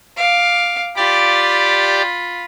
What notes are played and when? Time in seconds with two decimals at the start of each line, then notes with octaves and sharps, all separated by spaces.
0.17 F5 D6
0.96 F4 G4 D5 B5 D6